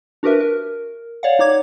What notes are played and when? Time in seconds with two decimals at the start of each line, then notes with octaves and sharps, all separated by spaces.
0.23 D4 F#4 G4 A#4 B4 E5
0.40 A#4
1.23 C#5 D5 F5 F#5
1.39 D#4 C#5 D6 G#6